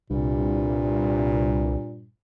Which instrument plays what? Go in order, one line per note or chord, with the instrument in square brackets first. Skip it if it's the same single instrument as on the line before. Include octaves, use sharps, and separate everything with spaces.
[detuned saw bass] C2 [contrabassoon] G2 [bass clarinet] A#2